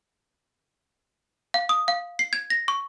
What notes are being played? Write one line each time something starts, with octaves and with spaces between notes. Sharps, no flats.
F5
D#6
F5
C7
G#6
A#6
C#6